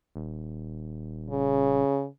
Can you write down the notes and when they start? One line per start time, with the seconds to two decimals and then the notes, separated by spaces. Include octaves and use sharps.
0.16 D#1
1.30 C#3